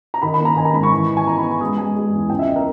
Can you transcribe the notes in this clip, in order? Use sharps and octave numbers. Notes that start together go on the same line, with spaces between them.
A#5
D#3 B5
B5
A#3
A#5
D#3 G#5
A#5
G#2 B5
C#6
E3
E3
G#5
B3 A#5
B5
B3
C#6
G#3 D#6
G#3 G#5
G#3
E2
C#2 G5
E5
D#5
A#4